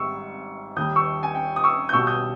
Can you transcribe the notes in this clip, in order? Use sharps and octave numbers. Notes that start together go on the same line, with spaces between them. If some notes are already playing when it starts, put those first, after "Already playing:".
Already playing: G#1 G#2 G3 C#6 E6
D#2 D#3 G3 D#6 G6
C#6 E6
G#5
G5
D#6
C#6 E6
G6
B1 B2 G3 C#6 E6
D#6 G6